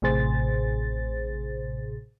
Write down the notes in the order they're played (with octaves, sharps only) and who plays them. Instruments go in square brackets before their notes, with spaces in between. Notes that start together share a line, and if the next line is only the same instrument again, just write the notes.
[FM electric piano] A1 A2 C3 G#4 C5 A6